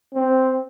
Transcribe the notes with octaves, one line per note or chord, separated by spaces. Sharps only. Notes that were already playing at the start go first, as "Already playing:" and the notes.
C4